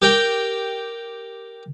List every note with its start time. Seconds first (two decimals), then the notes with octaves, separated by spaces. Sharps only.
0.02 G4 A#4 G5